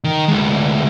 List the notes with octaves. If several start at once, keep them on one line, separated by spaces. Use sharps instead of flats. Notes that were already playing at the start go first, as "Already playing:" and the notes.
D#3
D2 G#3